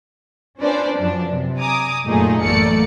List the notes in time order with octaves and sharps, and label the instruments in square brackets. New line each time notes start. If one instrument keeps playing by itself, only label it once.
[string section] C#4 D4 F4 B4 C5 D5
F#2 F3 D4
C3
G#5 A#5 D6 D#6
F#2 A#2 A3 D#4 G#4
A1 F#2 A3 A#3 D5 C#7